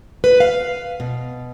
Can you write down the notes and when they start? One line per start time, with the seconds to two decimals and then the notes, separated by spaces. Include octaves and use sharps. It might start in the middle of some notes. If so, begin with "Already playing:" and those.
0.24 B4
0.40 F5
1.00 B2